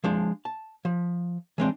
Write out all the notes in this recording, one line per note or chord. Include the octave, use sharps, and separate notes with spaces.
F3 G#3 D4
A5
F3
E3 G#3 C4 D4